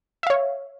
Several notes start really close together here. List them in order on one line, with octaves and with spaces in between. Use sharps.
E5 F5 C#5